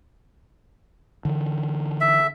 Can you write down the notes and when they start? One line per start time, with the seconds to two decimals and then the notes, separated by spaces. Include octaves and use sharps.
1.25 D3 E3
2.01 E5